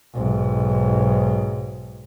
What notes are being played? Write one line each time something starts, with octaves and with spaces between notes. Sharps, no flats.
B1 G#2